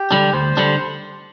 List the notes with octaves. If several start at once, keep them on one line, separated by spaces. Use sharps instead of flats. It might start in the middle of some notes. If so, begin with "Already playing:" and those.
Already playing: G4
D3 G3 D4
D2 C5
D3 G3 D4